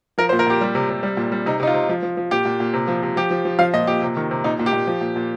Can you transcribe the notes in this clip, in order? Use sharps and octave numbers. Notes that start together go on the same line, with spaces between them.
F3 A#4
C5
A#2
A#4
A#2 G4
G3
C3
C3
G3
A#2
G3
C3 D#4
C3 D#4
F4
C3
F3
F3
F3
A#2 G4
A#2
A#2
C3
F3
C3
F3 G4
F3
F3
F3 F5
A#2 D#5
A#2 G4
C3
D#3
C3
A#2 D#4
A#2
G4
A#2
F3
A#2
A#2